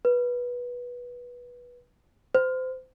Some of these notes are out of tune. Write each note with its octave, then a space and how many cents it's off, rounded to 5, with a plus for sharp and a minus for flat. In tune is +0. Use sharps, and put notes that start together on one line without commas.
B4 -15
C5 -25